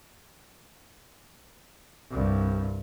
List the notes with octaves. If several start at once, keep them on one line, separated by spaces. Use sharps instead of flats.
C2 G2